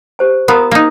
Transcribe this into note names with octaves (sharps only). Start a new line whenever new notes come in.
G4 C5 A5
B3 F4 A#4 A#5 D#6
A#3 D#4